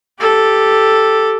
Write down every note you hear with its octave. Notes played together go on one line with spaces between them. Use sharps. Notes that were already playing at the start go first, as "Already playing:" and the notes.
G4 A4